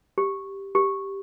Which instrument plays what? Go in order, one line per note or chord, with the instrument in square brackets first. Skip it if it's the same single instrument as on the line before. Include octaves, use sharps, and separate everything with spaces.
[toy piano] G4
G4